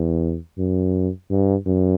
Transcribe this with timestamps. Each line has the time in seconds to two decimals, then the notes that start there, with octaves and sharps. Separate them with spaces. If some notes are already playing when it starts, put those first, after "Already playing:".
Already playing: E2
0.58 F#2
1.30 G2
1.66 F#2